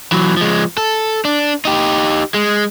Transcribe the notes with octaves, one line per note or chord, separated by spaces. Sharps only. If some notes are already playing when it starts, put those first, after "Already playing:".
E3 F#3
F3 G#3
A4
D4
D#4 G4
G#3